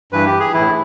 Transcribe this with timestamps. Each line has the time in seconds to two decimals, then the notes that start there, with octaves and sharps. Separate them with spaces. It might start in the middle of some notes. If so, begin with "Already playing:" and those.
0.12 G2 E3 B4
0.26 G4
0.40 G#4
0.54 A2 E3 E4